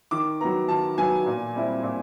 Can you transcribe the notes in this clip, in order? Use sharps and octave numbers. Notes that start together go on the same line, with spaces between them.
D#3 D6
F#3 B3 A#5
D#3 A5
F#3 B3 G#5
A#2
G3 C4 E4
A#2